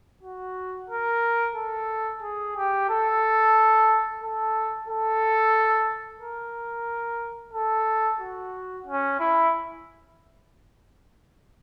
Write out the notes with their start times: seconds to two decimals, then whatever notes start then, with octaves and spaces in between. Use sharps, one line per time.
0.23 F#4
0.90 A#4
1.55 A4
2.22 G#4
2.56 G4
2.89 A4
4.22 A4
4.88 A4
6.21 A#4
7.53 A4
8.21 F#4
8.86 C#4
9.20 E4